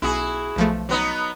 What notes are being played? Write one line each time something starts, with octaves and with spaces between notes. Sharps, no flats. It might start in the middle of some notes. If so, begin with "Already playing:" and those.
B1 E4 F#4 G#4
B1 F3 A3
F#3 B3 D#4